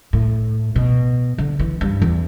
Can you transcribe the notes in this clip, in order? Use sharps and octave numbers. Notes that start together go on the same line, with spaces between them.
A2
B2
D3
E3
G2
E2